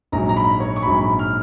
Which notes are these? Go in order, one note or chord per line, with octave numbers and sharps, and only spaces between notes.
A#1 G#2 F#3 A#5
A#5
B5
C#5
C#6
A#1 G#2 F#3 B5
B5
F6